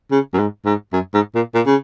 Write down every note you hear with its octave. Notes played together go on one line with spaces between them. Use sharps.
C#3
F#2
G#2
G#2
F#2
G#2
A#2
A#2
C#3